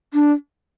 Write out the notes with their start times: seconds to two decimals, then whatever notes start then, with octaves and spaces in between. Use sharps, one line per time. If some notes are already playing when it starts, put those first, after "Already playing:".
0.14 D4